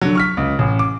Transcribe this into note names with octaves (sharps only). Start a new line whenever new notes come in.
D3 F#3
C#6 F6 B6
C#2
A1
D6